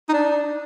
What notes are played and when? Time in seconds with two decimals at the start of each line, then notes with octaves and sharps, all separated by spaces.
0.09 D#4
0.13 D4